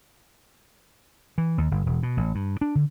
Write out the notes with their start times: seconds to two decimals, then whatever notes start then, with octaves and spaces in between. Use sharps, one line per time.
1.38 E3
1.58 D#2
1.71 G1
1.86 E1
2.03 B2
2.17 A1
2.35 G2
2.61 D4
2.75 D3